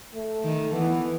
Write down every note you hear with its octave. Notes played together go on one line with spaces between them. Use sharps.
A3
D#3
E3 B3